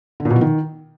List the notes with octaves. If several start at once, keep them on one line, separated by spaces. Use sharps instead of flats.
D3
A#2
B2
F3
D#3